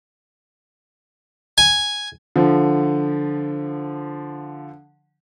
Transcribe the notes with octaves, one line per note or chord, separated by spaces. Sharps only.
G#5
D3 F3